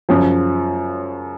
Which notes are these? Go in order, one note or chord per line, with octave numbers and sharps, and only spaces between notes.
F#2 C#3 F3